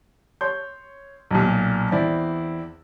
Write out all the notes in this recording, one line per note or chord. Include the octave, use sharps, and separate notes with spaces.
C#5 C6 G6
B1 A#2
E2 C4 E4 D5